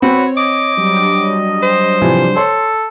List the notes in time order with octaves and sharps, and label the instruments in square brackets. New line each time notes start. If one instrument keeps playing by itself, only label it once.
[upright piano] C4 [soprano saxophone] F#4 [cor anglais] B4 [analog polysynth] C#5
[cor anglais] D#5 [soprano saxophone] D6
[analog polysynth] F#3 G3 D4
[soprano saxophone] C5
[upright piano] C3 E3 F3
[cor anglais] A4 [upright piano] C#5 C6